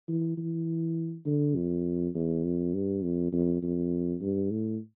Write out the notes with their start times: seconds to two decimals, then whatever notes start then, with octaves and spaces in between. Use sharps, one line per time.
0.08 E3
0.37 E3
1.26 D3
1.55 F2
2.15 E2
2.44 F2
2.74 G2
3.03 F2
3.32 F2
3.62 F2
4.21 G2
4.51 A2